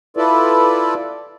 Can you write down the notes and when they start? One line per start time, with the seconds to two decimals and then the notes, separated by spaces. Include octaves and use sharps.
0.17 E4 F4 A4 B4 D5